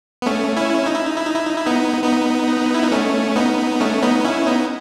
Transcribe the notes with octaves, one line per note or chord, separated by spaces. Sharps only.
B3
A3 C#4
C#4 E4
D#4
E4
D#4
E4
D#4
E4
D#4
E4
B3 D#4
B3 D#4
E4
D#4
A3 C#4
B3 D#4
A3 C#4
B3 D#4
C#4 E4
B3 D#4